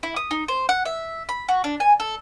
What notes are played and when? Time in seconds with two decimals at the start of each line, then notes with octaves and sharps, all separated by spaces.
0.03 E4
0.16 D#6
0.31 D#4
0.48 C5
0.69 F#5
0.85 E5
1.29 B5
1.49 F#4
1.64 D4
1.80 G#5
2.00 A4